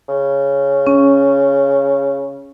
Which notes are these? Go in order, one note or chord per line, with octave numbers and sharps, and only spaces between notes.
C#3
C#4